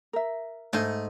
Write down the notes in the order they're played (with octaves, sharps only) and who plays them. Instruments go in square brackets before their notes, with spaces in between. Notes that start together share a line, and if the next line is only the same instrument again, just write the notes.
[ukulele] A#4 E5
[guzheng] G#2 D#5 [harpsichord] A3